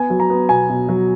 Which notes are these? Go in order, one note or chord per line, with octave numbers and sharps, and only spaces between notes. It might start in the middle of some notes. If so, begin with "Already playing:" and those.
Already playing: B3 G#5
F#3
A#5
B3
B2 G#5
B2
F#3